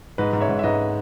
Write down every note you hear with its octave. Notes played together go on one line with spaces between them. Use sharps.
G#2 B4 D#5
G#2
C#5 E5
G#2
E5
G#2 B4 D#5